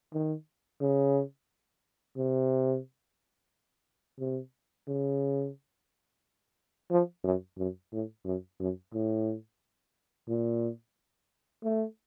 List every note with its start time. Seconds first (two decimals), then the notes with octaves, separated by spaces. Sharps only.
0.13 D#3
0.81 C#3
2.17 C3
4.19 C3
4.88 C#3
6.91 F3
7.24 F#2
7.58 F#2
7.93 A2
8.25 F#2
8.60 F#2
8.93 A2
10.28 A#2
11.64 A3